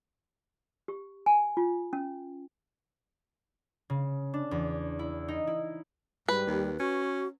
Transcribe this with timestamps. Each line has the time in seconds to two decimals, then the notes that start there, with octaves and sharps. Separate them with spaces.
0.88 G4
1.26 G#5
1.57 F4
1.93 C#4
3.90 C#3
4.34 D4
4.51 E2
4.99 E4
5.28 D#4
5.47 E4
6.28 G#2 G3 B4
6.47 D#2
6.79 C#4 F#4